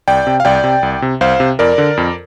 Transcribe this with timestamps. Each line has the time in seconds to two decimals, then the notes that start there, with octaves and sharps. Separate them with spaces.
0.08 C2 D5 G5
0.27 C3
0.40 F5
0.45 C2 D5 G5
0.64 C3
0.83 C2
1.02 C3
1.21 C2 C5 F5
1.40 C3
1.59 F2 A#4 D5
1.78 D3
1.97 F2